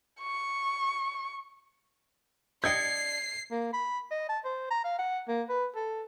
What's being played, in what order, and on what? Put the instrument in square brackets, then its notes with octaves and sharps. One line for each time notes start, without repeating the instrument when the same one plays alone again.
[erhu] C#6
[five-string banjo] D4 D#5 G5 [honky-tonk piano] G#6 C#7 [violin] C7
[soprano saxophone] A#3
B5
D#5
A5
C5
A#5
F5
F#5
A#3
B4
A4